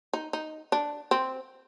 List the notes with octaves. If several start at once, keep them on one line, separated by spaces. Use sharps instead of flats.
D#4
D#4
D4
C4